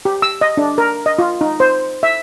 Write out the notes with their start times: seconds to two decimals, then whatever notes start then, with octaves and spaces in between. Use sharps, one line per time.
0.05 G4
0.22 E6
0.41 D#5
0.57 D4
0.78 A#4
1.06 D#5
1.19 F4
1.41 D#4
1.60 C5
2.03 E5